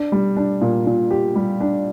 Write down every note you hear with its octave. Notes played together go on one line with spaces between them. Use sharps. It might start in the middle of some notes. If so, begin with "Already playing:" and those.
Already playing: D4
G3
D4
A#2
A#2
G4
G3
D4